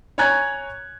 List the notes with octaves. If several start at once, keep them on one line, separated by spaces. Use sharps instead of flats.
C#5 G#5 A#5 F#6 G#6